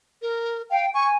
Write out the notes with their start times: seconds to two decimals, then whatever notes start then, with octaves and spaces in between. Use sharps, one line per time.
0.22 A#4
0.70 F5 G5
0.94 G#5 C#6